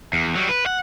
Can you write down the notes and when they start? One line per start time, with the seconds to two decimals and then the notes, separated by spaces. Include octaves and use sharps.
0.13 E2
0.35 F#3 G3
0.49 B4
0.66 F#5